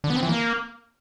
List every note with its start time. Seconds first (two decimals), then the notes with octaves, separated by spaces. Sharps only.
0.04 D3
0.10 B3
0.16 C4
0.23 E3
0.29 A#3